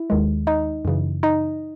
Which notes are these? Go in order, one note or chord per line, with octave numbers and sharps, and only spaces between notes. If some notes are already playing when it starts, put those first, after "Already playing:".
Already playing: E4
D#2 D#3 G#3
D#4 D#5
F#2 C#3 E3
D#4 D#5